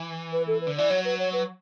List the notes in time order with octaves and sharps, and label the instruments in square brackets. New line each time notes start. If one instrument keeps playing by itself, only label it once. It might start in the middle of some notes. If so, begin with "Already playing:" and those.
Already playing: [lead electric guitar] E3
[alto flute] B4
A4
B4
[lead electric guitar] D3
[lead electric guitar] E3 [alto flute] D5
[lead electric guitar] F#3 [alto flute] C#5
[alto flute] B4
C#5
B4